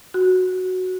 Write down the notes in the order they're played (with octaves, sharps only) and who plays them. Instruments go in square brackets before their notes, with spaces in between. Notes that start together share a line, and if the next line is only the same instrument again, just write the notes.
[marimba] F#4